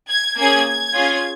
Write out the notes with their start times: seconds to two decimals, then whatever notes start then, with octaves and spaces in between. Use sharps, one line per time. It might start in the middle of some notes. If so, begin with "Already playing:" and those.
0.09 G#6
0.37 A#3 C#4 G#4 G#6
0.67 G#6
0.95 C#4 F4 G#4